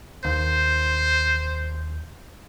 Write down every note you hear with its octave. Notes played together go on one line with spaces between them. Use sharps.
D#2 C5